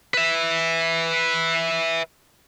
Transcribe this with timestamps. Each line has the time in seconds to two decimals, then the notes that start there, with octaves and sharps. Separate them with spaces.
0.14 B4 E5